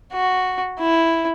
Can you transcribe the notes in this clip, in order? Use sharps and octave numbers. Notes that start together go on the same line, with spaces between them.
F#4
E4